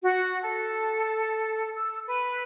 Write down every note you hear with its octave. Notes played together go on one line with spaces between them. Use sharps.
F#4
A4
E6
B4